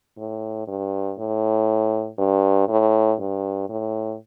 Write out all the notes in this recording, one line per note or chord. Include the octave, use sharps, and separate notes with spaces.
A2
G2
A2
G2
A2
G2
A2